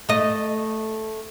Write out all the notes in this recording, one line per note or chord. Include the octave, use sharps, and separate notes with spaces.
A3 D#5